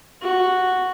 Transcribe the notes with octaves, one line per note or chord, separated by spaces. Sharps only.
F#4